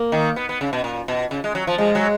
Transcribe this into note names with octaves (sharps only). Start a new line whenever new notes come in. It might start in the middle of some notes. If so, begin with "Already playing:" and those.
Already playing: A#3
D#3
B3
B3
C#3
B2
A#2
B2
C#3
G#3
F#3
F3
F3 G#3
F#3